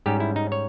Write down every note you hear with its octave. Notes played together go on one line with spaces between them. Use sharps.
G#2 G3 C#4 G4
E4
D#4
C#5